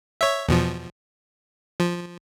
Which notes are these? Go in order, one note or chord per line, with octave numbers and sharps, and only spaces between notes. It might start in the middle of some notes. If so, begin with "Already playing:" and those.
C#5 E5
E2 B2 F3
F3